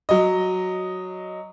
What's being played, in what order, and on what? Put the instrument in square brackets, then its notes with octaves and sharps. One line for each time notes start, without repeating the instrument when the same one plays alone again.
[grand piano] F#3 D#5